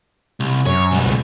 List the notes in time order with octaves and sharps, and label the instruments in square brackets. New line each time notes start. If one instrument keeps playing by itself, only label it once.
[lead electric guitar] C2
[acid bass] F#2 [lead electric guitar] C#5
[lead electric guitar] B2 G3
[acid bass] C#2